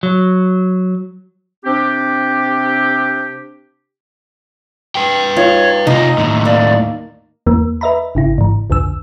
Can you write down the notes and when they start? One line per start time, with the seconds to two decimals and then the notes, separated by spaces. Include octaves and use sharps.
0.03 F#3
1.65 C3 C4 D4 G4
4.95 B4 G5
5.37 D#4 F4 C#5
5.87 C3 D#4 F4 D#5
6.18 D#2 A2
6.45 A#3 D5
7.46 E2 E3 A#3
7.81 B4 D#5 E5 A#5 B5
8.15 G#1 C#3 E4
8.38 G#2 E3
8.70 B1 F2 D3 E6